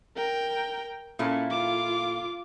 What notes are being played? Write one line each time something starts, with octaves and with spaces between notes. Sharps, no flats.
A#4 G5
A#2 C#4 E4 A4
F4 D6